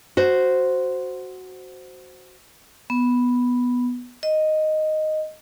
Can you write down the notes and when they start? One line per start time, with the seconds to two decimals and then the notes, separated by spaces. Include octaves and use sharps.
0.17 F#4 C5
2.90 B3
4.23 D#5